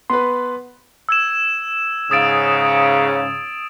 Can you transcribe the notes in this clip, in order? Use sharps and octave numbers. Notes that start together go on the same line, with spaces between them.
B3 B4 C6
E6 G#6 E7
G#2 C#3 D#6 A6 D7